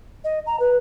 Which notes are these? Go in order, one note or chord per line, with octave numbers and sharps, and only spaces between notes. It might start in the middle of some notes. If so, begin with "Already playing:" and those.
D#5
A#5
B4